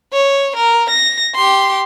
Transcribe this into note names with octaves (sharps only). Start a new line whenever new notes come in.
C#5
A#4
A#6
G4 C6